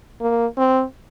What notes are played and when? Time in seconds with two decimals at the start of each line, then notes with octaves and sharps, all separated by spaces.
0.21 A#3
0.57 C4